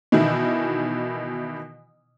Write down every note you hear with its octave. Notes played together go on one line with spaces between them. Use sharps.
B2 D#3 E3 E4